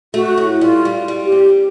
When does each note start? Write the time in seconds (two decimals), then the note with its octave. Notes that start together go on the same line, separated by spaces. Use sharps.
0.14 A3 F#4
0.37 A2
0.61 G3 F4
0.85 G3
1.08 G3
1.25 G4
1.32 C4